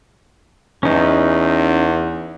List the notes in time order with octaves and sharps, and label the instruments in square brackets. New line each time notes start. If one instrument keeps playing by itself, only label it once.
[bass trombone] E2 [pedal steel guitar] C#4 D#4